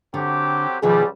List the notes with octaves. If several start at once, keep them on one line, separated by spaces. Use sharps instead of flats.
D3 F#3 C4 G4
C#2 B2 D#3 F3 G3 G#4